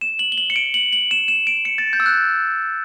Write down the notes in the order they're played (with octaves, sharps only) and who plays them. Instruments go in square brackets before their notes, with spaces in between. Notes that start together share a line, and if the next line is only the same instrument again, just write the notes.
[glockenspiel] E7
F#7
G7
F#7
C#7
D7
F#7
F#7
E7
E7
D7
C#7
A6
G6
E6
F#6